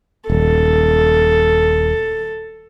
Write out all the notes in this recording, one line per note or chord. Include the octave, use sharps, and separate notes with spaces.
D#1 A4